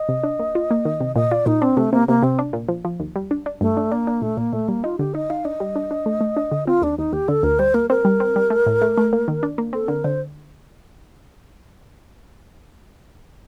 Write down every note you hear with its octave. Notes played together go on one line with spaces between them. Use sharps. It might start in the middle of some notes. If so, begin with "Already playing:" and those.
Already playing: D#5
C3
D4
A#3
F4
A#3
D#3
C3
A#2 D#5
F4 D5
A#2 D#4
C4 D4
C3 A3
C3 A#3
C3 A#3
C3 C4
D4
A#2
F3
F3
D#2
G3
D4
D4
G2 A3
D4
A#3 D4
D4
A#2 A3
A#2 A#3
A#2 A3
G3 A#3
D#4 F4
D3 G4
D#4 D#5
D#4 F5
D4 D#5
G3
D4
D4
A3
A3
D4
D3
C4 F4
D#2 D4
D#2 D#4
D#2 G4
D3 A4
D2 A#4
G3 C5
A#3 A#4
C4 A#4
G3
C4
G3
A3
A2
A3
A3
A#3
D#3
D4
A#3
C4 A4
D3 A#4
D3 C5